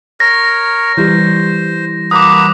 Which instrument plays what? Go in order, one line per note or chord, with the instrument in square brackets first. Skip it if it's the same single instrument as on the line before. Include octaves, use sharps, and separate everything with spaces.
[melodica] A#4 C#5 [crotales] A#6
[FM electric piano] E3 G3 [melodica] C5
[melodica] F#3 A#3 B4 [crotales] D6 D#6